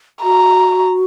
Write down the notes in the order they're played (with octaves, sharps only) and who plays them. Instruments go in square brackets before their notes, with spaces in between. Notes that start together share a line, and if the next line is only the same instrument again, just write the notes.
[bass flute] F#4 [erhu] A#5